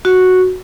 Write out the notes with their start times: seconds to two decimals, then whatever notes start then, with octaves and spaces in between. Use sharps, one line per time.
0.05 F#4